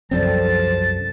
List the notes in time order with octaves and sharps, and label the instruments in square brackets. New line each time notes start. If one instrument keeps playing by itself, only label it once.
[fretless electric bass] C2 F#2 C4 [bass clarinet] F3 [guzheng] G3 A4 E5 [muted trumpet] A5